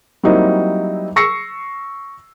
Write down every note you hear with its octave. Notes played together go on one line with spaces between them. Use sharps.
F#3 G3 A#3 C4 D#4 E4
C#6 E6 A#6 C7 C#7